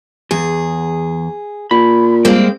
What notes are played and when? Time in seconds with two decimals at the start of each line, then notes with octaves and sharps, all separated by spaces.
0.31 E2 G#4
1.71 A#2 B5
2.25 G3 G#3 A#3 C4